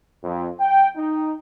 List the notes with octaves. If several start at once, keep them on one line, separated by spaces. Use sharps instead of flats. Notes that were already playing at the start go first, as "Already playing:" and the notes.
F2
G5
D#4